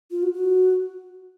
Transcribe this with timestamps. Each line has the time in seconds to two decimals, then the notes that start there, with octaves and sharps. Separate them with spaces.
0.11 F4
0.23 F#4
0.33 F#4